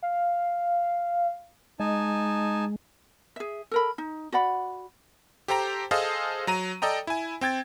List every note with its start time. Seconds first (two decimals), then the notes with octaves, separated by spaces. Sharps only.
0.02 F5
1.80 G#3 D#4 G#5 A5
3.36 G#4 E5
3.71 A4 A#4 B5
3.98 D#4
4.32 F#4 D5 F#5 B5
5.48 G4 A4 C5 G5 A#5
5.91 G#4 A4 C5 D#5 F5 A5
6.47 F#3 A#5 D#7
6.82 A4 D5 D#5 G5 A#5
7.07 E4 G#5
7.41 C4 G5 G#6 A6